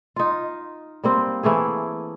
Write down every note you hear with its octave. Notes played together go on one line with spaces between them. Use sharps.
D#4 F4
G3 A#3 C4
E3 A3 A#3 G#4